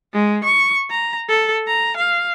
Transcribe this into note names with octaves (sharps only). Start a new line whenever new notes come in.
G#3
C#6
A#5
A4
A#5
F5